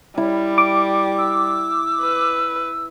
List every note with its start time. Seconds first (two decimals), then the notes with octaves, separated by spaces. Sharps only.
0.18 G3 E4
0.58 D6
1.18 E6
2.02 B4